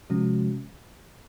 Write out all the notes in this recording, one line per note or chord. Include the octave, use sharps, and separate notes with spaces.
C3 F3 G#3 C#4 F#4